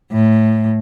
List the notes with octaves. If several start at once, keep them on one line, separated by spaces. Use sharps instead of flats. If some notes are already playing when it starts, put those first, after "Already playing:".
A2